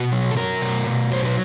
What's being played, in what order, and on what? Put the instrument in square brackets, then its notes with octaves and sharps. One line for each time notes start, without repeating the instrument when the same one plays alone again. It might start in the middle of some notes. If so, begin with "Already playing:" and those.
Already playing: [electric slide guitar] B2 F#4
F#3
A4
F#3 A#4
B2
B2
F#3 C5
B4